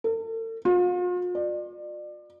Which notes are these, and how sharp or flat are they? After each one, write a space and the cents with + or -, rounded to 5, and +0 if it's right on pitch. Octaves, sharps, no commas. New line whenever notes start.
A4 +45
F4 +40
D5 +35